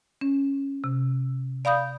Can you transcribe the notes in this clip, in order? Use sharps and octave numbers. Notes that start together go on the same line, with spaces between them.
C#4
C3
D5 F5 B5 D#6 G6